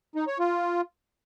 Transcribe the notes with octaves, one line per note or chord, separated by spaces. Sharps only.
D#4
C#5
F4